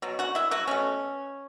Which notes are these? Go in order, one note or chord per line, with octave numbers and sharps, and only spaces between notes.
B2 F#3
F#4 F#5
E4 E5
F#3 F#4
B2 A3 C#4